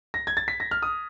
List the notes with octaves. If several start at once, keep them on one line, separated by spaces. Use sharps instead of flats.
A#6
G#6
A6
B6
A#6
F6
D#6